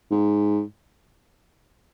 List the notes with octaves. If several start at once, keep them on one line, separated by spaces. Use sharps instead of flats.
G#2